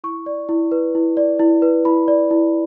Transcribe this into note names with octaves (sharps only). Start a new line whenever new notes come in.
E4 C#6
D5
E4
B4
E4
D5
E4
B4
E4 B5
D5
E4